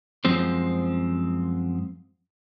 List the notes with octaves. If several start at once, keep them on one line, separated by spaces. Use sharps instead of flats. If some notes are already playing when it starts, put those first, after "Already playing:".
F#2 F3 G#3 C4 C5